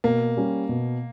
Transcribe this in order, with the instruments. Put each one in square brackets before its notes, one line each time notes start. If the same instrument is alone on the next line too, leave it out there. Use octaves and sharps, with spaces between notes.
[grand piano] B2 [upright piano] A#3
[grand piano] G3 C#4 G4
B2